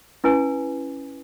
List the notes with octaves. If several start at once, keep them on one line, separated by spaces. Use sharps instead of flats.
C#4 E4 B4 G#5